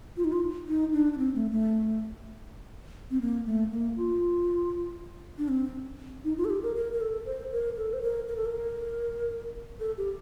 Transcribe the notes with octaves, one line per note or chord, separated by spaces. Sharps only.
F4
D#4
F4
D#4
D4
D4
C4
A3
A3
C4
A#3
A3
A#3
F4
D4
C4
D#4
F4
A4
G4
A#4
A#4
A#4
A4
C5
A#4
A4
C5
A#4
A#4
A4
A#4
A4
G4